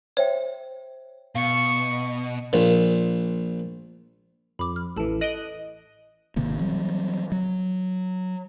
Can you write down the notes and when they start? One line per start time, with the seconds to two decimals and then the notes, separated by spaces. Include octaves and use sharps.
0.17 C5 C#5 E5 G5
1.35 B2 F5 C#6
2.53 A#1 A#2
4.59 F2 B5 D6
4.76 F6
4.97 A1 E3 A4 A5
5.21 D#5 D#6 F#6 D7 G7
6.36 G#1 C3 D#3 A#3
6.59 E3 F#3 G3 C4
7.32 F#3